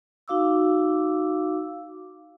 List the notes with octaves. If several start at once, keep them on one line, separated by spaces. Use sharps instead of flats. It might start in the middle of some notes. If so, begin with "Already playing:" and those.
D#4 F#4 F5 D6 E6